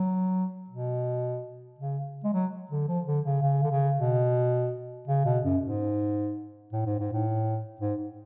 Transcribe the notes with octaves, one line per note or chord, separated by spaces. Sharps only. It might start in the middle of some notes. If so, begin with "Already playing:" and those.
Already playing: F#3
B2
C#3
G#3
F#3
D3
F3
D3
C#3
C#3
D3
C#3
B2
C#3
B2
F#2
G#2
A2
G#2
G#2
A2
G#2